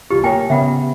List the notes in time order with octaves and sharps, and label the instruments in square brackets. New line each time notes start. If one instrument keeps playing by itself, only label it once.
[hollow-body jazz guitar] C2 A#2 F4 [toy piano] G4
[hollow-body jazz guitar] A#3 A#4 C#5 [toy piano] G5 G#5
[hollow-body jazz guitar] C#3 B3 [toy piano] E5 F#5 B5